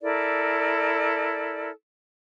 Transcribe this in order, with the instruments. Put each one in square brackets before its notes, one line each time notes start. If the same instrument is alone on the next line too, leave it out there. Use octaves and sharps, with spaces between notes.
[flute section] E4 A4 A#4 D5